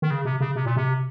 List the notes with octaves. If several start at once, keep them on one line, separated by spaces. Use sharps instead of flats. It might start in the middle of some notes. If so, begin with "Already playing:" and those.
D#3
C#3
C3
C#3
C3
A#2
C3